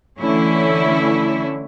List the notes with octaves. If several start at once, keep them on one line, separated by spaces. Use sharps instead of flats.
D3 E3 A3 C#4 E4